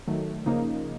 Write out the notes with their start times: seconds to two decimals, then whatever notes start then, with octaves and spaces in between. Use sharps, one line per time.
0.07 D#3 F#3 A3
0.46 C#3 F3 A#3 D#4